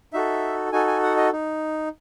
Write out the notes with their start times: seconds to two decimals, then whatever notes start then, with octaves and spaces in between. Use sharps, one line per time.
0.13 D#4 F#4 A4 E5
0.72 D#4 F#4 A4 G#5
0.87 G#5
1.03 F#5
1.17 D#5
1.33 D#4